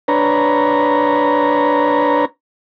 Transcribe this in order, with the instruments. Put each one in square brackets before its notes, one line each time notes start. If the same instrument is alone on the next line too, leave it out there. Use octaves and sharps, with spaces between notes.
[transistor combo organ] D4 B4 C#5 A#5